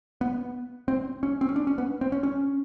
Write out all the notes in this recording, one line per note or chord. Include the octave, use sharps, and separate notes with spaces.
B3
C4
C#4
C4
C#4
D4
C#4
B3
C4
C#4
C#4